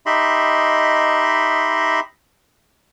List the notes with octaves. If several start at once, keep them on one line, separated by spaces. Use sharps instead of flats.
D#4 G4 D#5 E5 B5 C6